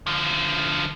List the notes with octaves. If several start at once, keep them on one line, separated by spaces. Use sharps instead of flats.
D3 F3